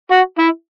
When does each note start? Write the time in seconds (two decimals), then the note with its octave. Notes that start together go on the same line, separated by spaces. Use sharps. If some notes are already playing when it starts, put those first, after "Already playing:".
0.11 F#4
0.39 E4